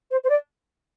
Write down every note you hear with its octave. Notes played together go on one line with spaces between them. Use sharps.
C5
C5
D5